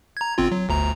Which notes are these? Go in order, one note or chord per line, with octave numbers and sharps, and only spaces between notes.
A#5 G#6
G1 C4 F4
F#3
G1 D2 A#5